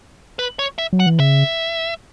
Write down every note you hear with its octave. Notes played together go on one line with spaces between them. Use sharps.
B4
C#5
E5
F#3
F#5
E3
C#3 E5